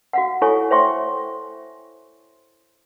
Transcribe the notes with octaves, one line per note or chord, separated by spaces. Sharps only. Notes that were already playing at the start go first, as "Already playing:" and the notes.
F#4 F5 F#5
E4 A4 C#5 G#5 C#6
C5 C#5 E5 G5 C6 C#6